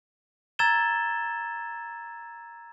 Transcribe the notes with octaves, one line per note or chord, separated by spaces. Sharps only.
A#5 E6 G#6 A6 E7 G7